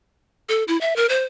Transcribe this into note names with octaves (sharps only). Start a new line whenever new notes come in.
A4
E4
E5
A#4
C5